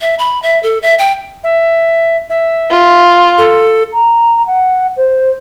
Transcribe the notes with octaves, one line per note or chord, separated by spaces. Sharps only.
E5
B5
E5
A4
E5
G5
E5
E5
F4
A4
A#5
F#5
C5